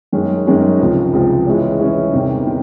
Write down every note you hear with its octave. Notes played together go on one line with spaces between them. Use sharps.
F#2 D#3 G#3 C#4
F#2 D#3 G#3 C#4
C#2 C3 F3
C#2 C3 F3
E3 G#3 C#4
E3 G#3 C#4
E2 C3 D#3
D#3